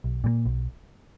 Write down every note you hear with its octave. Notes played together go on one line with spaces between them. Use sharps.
B1
A#2 G3 A#3
B1